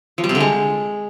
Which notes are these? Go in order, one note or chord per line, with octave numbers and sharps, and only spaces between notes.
F3
G3
C3
D3
G#3